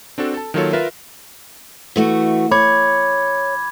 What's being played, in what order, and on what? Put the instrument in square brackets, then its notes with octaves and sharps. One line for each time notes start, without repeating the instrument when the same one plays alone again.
[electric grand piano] C4 D4 F#4 A4
A4 A5
D#3 F#3 A#3 F4 A4 C#5
F4 A#4 B4 E5
[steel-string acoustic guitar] E3 A3 F#4
[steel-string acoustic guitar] C#5 [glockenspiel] B5 D6 G#6